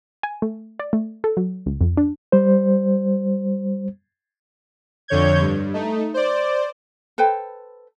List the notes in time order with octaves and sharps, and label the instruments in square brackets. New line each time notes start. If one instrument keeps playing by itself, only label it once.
[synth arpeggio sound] G#5
A3
D5
A3
A4
F#3
C#2
F2
D4
[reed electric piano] G3 C5
[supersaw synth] F2 D3 C#5 G6 G#6
G2
A3 D#4
C5 D5
[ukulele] A4 B4 C5 G5